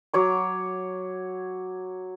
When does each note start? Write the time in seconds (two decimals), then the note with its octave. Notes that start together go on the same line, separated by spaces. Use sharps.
0.14 F#3 C#5 D6